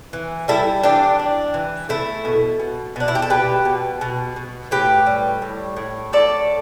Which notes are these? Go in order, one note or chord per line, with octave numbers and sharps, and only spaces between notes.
E3
G3 E4 A4
E3 D4 G4
D4
E3
A3 E4 A4
B2
B2
B2 D4
E4
G4
A4
B2 G4 B4
B2
B2
B2
A2 G4 B4
G3
A2
A2
A2 A4 D5